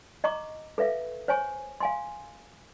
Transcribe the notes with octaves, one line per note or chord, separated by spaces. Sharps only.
D#5 A#5 C#6 D6
A4 B4 E5 F5
C5 C#5 G#5 C#6
F5 G#5 C6